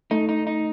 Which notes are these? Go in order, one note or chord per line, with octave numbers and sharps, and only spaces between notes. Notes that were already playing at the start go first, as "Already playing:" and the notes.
A3 D#4
D#4
D#4